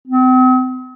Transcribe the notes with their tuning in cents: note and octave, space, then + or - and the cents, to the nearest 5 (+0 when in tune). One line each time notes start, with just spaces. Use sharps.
C4 -40